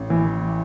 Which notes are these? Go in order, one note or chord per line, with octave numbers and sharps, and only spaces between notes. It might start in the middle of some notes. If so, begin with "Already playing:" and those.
Already playing: A1
E3